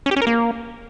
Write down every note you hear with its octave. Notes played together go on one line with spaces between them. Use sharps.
C#4
G4
C#4
A#4
A#3